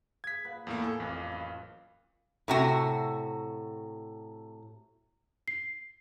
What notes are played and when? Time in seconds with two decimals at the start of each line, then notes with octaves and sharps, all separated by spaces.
0.24 G#4 G#6 B6
0.44 A#2 B4 F#5
0.67 E2 A2 A#3
0.82 A4 G#5
1.00 A1 F2 D5 F5
1.32 F#2
2.48 A2 C3 F#4
5.48 C7